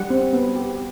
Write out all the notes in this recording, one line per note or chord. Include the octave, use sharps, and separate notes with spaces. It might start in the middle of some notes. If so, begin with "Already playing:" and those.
Already playing: G3 F#5
C4
B3
G4